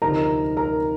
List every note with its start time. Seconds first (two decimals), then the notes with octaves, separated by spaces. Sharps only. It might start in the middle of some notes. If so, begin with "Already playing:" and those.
0.02 D2 C3 F3 A3 D#4 A#4 A#5
0.57 A#4 A#5